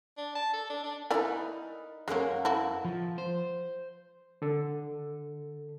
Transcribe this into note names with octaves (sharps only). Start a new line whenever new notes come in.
D4
A5
A4
D4
D4
D#4 E4 A#4 B4 D5 G#5
F#2 G#3 A#3 C#4 A#4
E4 F#4 A4
F3
C5
D3 A4